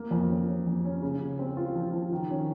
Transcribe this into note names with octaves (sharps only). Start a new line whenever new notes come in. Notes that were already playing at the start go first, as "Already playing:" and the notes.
Already playing: A#3
F2
C#4
C#4
F2
C#4
C#3
C#3
C4
F4
F3
F3
D#3
C#4